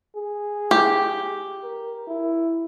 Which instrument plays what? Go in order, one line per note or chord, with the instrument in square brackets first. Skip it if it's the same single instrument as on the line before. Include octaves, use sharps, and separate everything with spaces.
[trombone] G#4
[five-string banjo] G4
[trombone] A#4
E4